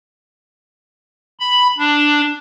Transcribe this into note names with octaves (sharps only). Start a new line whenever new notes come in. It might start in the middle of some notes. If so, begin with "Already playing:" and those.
B5
D4